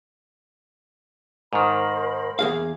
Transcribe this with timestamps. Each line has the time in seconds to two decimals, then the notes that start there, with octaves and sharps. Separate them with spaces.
1.53 G#2 D#3 A#4 C5 B5
2.39 E2 G#4 F5